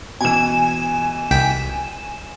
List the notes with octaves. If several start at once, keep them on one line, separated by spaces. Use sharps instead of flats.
B2 E3 G#5 E7
C2 G5 B6